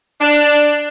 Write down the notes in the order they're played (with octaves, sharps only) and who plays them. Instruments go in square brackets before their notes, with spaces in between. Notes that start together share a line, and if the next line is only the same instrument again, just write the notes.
[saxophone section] D4